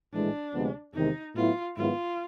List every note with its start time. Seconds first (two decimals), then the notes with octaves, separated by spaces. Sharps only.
0.13 A#1 A2 E3 G#3 D4
0.54 D2 C3 F3 G#3 B3
0.94 E2 C3 D#3 G#3 D#4
1.35 A2 F#3 B3 E4 F4
1.76 G#2 D#3 F#3 B3 E4 F4